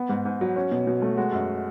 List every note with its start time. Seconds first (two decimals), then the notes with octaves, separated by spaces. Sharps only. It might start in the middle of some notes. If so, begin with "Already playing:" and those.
Already playing: B3
0.09 G#2
0.25 G#2
0.41 F#3
0.56 C#4
0.72 B2
0.87 B2
1.02 A3
1.17 G#3 F#4
1.33 F#2